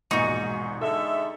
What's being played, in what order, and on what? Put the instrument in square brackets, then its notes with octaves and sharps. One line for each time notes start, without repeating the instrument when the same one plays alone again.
[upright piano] E1 A#1 G#2 [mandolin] D#4 F#4
[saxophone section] D3 G#3 E5 [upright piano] A4